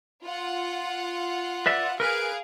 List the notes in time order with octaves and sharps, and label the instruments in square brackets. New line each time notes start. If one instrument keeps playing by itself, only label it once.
[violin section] F4 F#5
[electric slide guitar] B4 D5 E5
[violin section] G#4 F5 D7 [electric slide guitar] A#4 B4